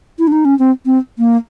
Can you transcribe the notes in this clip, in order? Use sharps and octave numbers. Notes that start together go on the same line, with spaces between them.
E4
D4
D#4
C#4
C4
C4
A#3